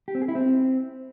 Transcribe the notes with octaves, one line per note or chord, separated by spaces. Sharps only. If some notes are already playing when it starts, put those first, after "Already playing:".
G4
C4
G#4
E4
C4